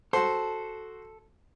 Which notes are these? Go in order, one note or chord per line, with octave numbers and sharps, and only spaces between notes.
F#4 A4 C5